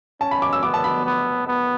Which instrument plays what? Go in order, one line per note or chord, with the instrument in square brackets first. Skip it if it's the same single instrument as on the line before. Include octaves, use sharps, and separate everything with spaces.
[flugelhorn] C#4 [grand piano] A5
[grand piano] B5
D6
E6
[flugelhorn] B3 [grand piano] D6
[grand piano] A5
B5
[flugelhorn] B3
B3